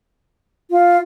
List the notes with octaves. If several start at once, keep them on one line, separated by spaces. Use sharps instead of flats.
F4